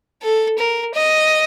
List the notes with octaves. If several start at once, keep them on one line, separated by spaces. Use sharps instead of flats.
A4
A#4
D#5